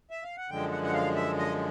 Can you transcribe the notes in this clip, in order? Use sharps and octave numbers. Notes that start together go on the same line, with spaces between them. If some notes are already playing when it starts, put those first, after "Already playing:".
E5
F5
F#5
F#2 D3 F3 G#3 G5
F#5
F#5
F5
E5
D#5